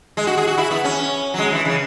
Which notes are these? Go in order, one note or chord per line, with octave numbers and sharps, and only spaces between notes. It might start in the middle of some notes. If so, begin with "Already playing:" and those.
G#3
F#4
G#4
F#4
E4
B3
C#4
F#3
G#3
E3
C#3